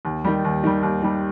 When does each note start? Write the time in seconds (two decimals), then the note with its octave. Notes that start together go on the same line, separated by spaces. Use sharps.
0.05 D#2
0.25 D#3 G3
0.45 D#2
0.64 D#3 G3
0.83 D#2
1.02 D#3 G3